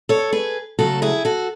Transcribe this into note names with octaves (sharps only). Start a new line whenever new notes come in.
A4 C#5
G#4 B4
C#3 F#3 A3 F#4 A4
E4 G#4
F#4 A4